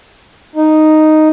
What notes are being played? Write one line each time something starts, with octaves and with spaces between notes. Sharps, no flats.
D#4